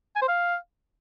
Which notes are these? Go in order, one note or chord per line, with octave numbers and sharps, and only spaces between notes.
G#5
C5
F5